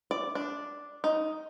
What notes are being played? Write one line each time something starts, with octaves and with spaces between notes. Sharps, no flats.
D5
D4
D#4